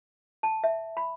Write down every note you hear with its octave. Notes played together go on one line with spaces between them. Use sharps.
A5
E5
B5